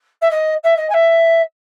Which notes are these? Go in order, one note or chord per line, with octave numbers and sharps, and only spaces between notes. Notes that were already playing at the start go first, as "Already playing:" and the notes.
E5
D#5
E5
D#5
G#5
E5